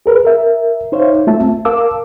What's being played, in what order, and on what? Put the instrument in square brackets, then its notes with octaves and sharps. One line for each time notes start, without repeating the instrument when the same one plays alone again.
[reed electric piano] G#4 A#4 B4
A#4 E5
D#4 C5 C#5 E5 F5
A3 F4 E5 A5
C4
A#4 F5 A5 D6 E6